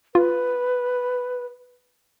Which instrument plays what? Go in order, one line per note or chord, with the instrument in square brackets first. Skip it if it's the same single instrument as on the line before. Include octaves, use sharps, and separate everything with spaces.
[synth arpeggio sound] F4 [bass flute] B4